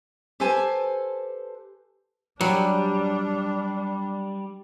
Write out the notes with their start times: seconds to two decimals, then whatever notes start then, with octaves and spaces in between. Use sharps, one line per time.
0.40 G4 A4 B4 C5 G#5 A5
2.41 F#3 G3 D4 G4